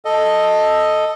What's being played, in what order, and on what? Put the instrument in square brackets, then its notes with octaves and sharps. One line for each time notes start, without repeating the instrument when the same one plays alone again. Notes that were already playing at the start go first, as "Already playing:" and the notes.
[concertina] A4 D#5